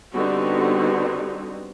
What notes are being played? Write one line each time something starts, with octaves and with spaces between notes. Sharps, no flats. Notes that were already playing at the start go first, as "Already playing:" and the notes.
D3 G3 B3 C4 D#4 F#4